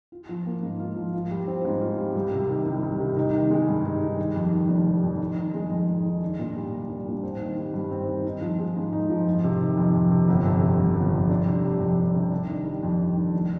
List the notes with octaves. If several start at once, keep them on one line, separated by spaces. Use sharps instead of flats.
F4
F3
A#3
G#2
F4
F3
F4
G3
C4
G#2
F4
G3
C2
C3
D#3
C2
C2
C3
D#4
D#3
G#3
G2
D#4
D#3
G3
F2
D#3
F1
G3
F2
D#4
D#3
G#3
F2
D#4
D#3
D4
A#2
G3
C2
D4
A#2
C4
D#3
G3
G2
C4
D#3
D#4
F3
G#3
G#2
D#4
F3
F2
C3
D#3
F2
F2
C3
G1
F2
C3
G1
G1
F2
D4
C3
G3
F2
D4
C3
D4
D#3
G3
F2
D4
D#3
F1